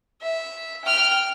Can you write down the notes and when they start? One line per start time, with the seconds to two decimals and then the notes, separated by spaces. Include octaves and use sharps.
0.21 E5
0.85 G5 F6